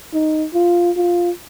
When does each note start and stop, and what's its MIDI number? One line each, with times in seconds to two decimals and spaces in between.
0.14 0.47 63
0.53 0.91 65
0.97 1.31 65